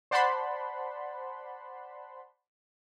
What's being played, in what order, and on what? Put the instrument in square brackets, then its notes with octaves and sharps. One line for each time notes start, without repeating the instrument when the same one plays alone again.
[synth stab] C5 D5 F#5 A5 B5 C6